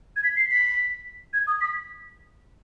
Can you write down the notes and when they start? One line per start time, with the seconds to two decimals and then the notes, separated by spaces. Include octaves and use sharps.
0.16 G#6
0.24 B6
0.36 C7
0.51 B6
1.33 G#6
1.47 D#6
1.61 B6